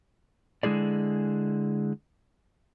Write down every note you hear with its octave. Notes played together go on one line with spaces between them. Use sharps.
D3 G#3 E4 G#4 D5